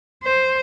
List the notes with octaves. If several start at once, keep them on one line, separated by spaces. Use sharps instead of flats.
C5